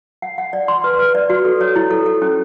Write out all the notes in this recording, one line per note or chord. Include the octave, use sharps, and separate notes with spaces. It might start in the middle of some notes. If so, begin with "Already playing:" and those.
F#5
F#5
D5
C6
B4
B4
D5
F#4
A4
C#5
E4
A4
A4
C#4